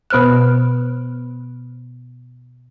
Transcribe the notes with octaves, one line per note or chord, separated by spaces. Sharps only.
B2 B3 C5 F6 F#6